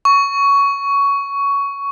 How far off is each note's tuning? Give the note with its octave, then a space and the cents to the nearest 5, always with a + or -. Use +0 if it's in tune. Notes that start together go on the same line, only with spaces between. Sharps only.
C#6 +15